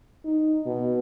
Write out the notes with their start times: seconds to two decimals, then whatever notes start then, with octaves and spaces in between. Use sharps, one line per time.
0.25 D#4
0.66 B2